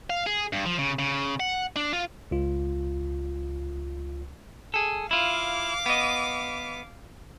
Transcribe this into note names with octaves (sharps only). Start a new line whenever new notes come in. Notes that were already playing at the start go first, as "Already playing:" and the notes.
F5
G#4
G2
F3
C#3
C#3
F#5
D4
F4
C#2 F4
G#4 A4
E4 F4 F5 D6
B3 D#5